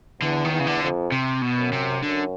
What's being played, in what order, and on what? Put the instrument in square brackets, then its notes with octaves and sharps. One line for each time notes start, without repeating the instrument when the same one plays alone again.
[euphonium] E2 [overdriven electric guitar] D3
[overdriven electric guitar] D#3
[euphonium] E2
[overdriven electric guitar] C#3
D3
[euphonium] F2
[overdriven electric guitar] C3
B2
[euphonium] F#2
[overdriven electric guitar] C3
[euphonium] F#2 [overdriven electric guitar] D3